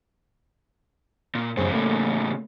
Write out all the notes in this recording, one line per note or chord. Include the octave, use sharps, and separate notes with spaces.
A#2
F#2 A2 C#3 G#4 C5
A3 A#3